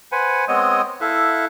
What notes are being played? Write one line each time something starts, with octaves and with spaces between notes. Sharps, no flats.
B4 C5 F#5 G#5 B5
G#3 B3 C4 C#5 D#5 D#6
E4 A4 E5 F5 F#6